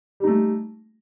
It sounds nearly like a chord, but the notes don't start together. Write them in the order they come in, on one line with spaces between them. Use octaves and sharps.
G3 D#4 A3